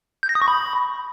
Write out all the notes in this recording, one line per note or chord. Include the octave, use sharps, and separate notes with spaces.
G6
A#6
D#6
C#6
B5